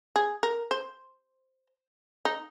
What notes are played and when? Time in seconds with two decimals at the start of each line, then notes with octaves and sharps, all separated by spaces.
0.16 G#4
0.43 A#4
0.71 C5
2.25 D#4